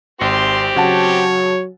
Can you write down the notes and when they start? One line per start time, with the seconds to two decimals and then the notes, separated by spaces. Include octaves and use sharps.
0.21 G#1 C4 G4 C6
0.76 C#3 F#3 C#5 F#5 A5